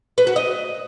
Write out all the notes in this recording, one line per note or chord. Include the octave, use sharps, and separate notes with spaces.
B4
F#4
D#5